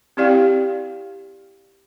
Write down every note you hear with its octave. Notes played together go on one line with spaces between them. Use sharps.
C4 E4 G4 D5 F5 G5